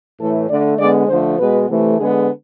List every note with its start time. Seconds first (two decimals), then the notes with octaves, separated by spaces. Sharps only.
0.19 A2 E3 A3 A4
0.49 D3 A3 D5
0.78 D3 G#3 B3 D5
1.08 D3 F3 A3 C5
1.38 B2 G#3 B3 B4
1.68 C3 E3 A3
1.99 D3 G#3 B3 G#4